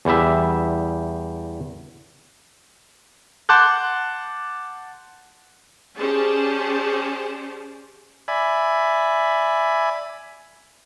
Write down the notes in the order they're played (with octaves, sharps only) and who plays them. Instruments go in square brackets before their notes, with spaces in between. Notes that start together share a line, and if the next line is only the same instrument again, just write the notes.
[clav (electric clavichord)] E2 G3 E5
[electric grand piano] F#5 A5 C6 D6 F#6 G6
[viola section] C#4 G4 G#4 C5 D5 A5
[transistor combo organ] D5 E5 G#5 B5